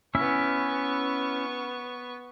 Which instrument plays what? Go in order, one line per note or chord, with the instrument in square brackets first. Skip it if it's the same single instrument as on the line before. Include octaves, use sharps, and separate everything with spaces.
[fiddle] B3 C#6 [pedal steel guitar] C#4 E4 E5